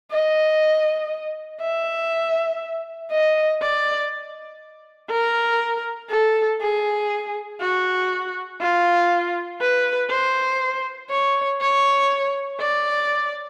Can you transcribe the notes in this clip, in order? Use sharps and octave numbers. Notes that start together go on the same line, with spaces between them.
D#5
E5
D#5
D5
A#4
A4
G#4
F#4
F4
B4
C5
C#5
C#5
D5